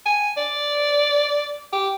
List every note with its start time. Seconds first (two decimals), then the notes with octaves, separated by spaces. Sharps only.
0.06 G#5
0.37 D5
1.73 G4